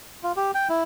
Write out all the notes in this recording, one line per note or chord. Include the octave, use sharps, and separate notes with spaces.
F4
G4
G5
E4